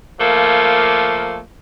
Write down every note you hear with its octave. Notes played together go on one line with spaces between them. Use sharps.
F3 A3 A#3